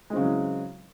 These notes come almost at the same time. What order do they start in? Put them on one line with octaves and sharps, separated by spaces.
G#3 C4 C#3 F#3 E3